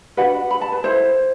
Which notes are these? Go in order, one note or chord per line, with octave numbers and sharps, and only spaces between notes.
D4 F#4 B4 F#5
B5
A5
B4
E4 A4 C5